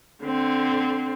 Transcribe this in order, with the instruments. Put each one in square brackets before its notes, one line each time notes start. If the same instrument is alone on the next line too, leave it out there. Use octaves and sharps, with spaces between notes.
[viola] D3 C4